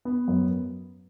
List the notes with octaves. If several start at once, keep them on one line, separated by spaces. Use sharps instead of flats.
B3
F#2